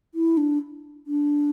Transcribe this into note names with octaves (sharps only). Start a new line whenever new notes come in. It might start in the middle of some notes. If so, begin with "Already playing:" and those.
E4
D4
D4